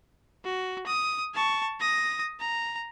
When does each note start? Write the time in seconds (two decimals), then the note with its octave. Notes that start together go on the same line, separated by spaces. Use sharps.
0.45 F#4
0.86 D#6
1.35 A5 C#6
1.81 D#6 A#6
2.40 A#5